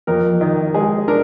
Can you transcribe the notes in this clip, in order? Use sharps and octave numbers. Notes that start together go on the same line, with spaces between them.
F2 A#4
D#3
G#3 G#4
D4 A#4